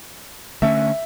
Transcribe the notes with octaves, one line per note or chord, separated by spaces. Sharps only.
D3 A3 C#4 E5